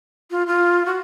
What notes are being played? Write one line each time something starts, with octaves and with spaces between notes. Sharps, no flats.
F4
F4
F#4